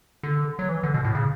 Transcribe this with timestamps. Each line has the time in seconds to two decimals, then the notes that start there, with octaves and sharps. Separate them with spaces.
0.23 D3
0.59 F#3
0.69 E3
0.83 D3
0.94 B2
1.05 A2
1.15 C#3